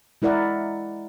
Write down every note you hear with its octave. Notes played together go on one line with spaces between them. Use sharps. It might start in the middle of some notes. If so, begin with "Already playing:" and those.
G#3 E4 A#4 D5 F#5